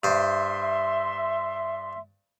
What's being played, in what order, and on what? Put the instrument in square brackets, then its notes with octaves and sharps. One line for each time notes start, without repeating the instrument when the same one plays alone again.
[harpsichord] G2 C5 [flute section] E5 C6